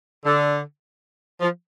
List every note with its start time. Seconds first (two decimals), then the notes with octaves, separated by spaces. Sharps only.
0.26 D3
1.40 F3